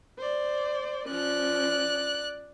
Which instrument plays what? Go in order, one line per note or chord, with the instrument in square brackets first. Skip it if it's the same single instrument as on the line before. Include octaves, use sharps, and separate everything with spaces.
[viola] C5 D5
[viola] F3 C#4 [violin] D5 F#6